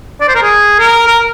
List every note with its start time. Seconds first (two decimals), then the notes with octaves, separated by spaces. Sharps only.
0.21 D5
0.28 C5
0.35 A#4
0.42 G#4
0.79 A#4
1.08 A#4